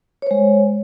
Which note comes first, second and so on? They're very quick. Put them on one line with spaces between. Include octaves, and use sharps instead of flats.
C#5 C5 G#3